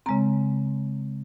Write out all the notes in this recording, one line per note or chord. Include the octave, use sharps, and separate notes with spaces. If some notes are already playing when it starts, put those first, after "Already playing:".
C#3 G#3 C4 A#5